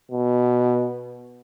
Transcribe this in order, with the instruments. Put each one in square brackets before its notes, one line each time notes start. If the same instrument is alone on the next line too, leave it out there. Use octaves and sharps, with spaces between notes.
[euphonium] B2